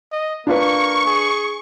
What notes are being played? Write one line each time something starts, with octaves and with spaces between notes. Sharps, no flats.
D#5
A#3 D4 F4 B4 C#6
G#4